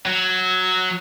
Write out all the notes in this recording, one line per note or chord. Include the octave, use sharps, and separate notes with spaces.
F#3